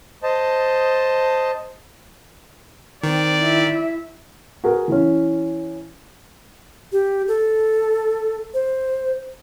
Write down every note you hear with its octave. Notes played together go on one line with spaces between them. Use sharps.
C5 D#5 A5
D#3 C4 D5
E4 E5
F#4 G#4 A#4 B4
E3 C#4
G4
A4
C5